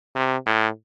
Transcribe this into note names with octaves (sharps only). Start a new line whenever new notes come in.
C3
A2